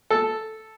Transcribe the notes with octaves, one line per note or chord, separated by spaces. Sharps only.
A4